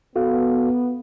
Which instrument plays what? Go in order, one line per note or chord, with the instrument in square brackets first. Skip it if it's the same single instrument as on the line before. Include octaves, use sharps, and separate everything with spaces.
[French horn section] B3 [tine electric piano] F#4 A4 F5